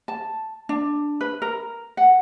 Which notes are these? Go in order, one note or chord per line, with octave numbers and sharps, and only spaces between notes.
A5
D4
B4
A#4
F#5